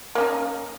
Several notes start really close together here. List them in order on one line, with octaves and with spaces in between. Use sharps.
A#3 C#4 D#4